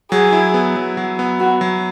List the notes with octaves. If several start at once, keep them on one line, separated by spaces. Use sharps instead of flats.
F#3 G#4
E4
B3
F#3
F#3
B3
B3 F#4
F#3